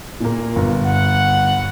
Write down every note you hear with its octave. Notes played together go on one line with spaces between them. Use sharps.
A#2 A#3
G1
F#5